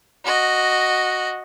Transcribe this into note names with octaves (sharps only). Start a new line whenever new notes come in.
F#4 D#5